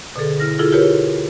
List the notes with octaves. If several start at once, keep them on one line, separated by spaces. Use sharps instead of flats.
B2 D3 G#4 A4
E4 F6 A#6
E4 F4 G#4 A4
F4 G4 G#4 A#4 B4 C#5